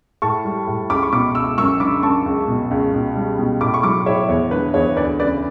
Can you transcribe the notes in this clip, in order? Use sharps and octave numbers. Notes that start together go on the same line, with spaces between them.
A2 A5 C#6
G3
A2
C#2 B5 D6
C#6
B2 B5 D6
C#2 C#6 E6
F#2 C#6 E6
D3 B5 D6
F#2 A5 C#6
C#2
B2
C#2
B2
G3
B2
A2 B5 D6
C#6
F#3 B5 D6
A2 C#5 E5
E2 C#5
D3 B4
E2 C#5
D2 B4 D5
C#3 B4 D5